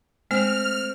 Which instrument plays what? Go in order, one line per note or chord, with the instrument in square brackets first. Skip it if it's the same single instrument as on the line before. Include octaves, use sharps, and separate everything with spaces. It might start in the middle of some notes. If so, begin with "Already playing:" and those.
[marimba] G#3 [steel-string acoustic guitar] A3 C4 [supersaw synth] F6